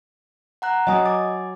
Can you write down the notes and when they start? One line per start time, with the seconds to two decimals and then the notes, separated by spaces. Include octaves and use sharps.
0.62 F#5 A#5 F#6
0.87 F#3 D#5 G#5 D#6
1.06 G#5 D6 A6